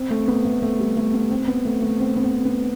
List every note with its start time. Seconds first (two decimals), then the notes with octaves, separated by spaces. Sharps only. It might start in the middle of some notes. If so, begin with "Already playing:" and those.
Already playing: C4
0.11 A3
0.28 B3
0.45 A3
0.62 A3
0.80 G3
0.97 A3
1.14 B3
1.31 C4
1.48 B3
1.65 A3
1.82 A3
2.00 C4
2.16 B3
2.23 C4
2.45 B3